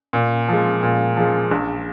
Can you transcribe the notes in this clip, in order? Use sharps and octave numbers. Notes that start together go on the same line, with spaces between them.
A#2
F3 G#3
A#2
F3 G#3
A#1